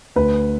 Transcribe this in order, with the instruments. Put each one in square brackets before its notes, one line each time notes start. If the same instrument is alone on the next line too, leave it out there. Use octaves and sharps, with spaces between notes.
[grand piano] D2 B4